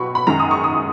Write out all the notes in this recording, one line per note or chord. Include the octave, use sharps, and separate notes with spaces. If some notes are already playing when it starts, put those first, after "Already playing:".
Already playing: B2 F#3 B5 C#6
B5
F#2 D#3 G#3 A#5
D#6
C#6
D#6